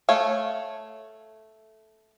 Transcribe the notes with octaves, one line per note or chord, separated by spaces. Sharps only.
A3 C#5 F5